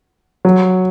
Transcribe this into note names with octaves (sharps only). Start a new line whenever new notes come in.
F#3